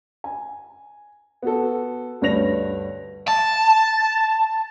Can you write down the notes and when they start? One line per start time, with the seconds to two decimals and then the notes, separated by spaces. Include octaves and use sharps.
0.24 G#5
1.42 B3 F#4 A4
2.21 D2 G2 B4 C#5 A#6 F7
3.28 A5